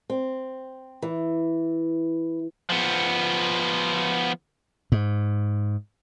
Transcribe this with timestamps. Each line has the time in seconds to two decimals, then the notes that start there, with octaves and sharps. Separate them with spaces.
0.10 C4
1.02 E3
2.70 F3 B3
4.92 G#2